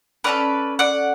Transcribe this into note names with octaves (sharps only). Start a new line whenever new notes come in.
C#4 F#4 A4 B4 D5
D5 F#5